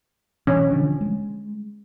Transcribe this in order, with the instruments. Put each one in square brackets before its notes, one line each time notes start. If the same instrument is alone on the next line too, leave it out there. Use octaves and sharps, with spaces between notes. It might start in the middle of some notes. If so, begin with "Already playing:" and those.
[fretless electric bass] B2 E3 [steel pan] C#4
[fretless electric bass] D3 F3 D4
G#3